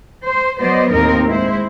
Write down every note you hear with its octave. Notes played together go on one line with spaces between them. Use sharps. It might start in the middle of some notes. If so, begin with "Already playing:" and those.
C5
F#3 B3 C5 D5 D#5
D#2 A2 A#3 C4 D#4 A#4
G#3 E4 C5